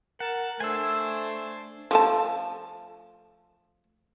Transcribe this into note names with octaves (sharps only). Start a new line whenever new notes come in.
A#4 F#5 A5
A3 D4 C5 G#5 E6
F3 A3 A5